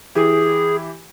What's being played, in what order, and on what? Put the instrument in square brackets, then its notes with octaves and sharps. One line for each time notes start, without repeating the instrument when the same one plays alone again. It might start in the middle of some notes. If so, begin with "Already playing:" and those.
[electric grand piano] E3 E4 G4 [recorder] G#4